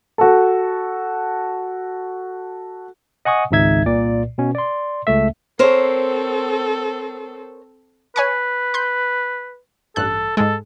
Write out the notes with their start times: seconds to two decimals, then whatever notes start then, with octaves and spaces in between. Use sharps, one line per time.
0.18 F#4 A4
3.25 D#5 F#5 G#5 C#6 D#6
3.51 G#1 C#2 D#4 E5 G#6
3.86 C2 A#2 D5
4.38 B2 C#4
4.55 D5 C6
5.07 C#2 A3 E5
5.59 C4 A4 A#4 C5 C#5
8.16 B4 C#5 G#5 C#6
8.74 C6 G6
9.96 A1 G2 A4 F#6
10.37 G#2 G#3 A4